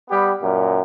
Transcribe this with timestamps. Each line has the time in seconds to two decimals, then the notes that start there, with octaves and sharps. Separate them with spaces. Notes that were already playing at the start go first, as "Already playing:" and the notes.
0.10 G3 B3 G4
0.42 F#2 A#2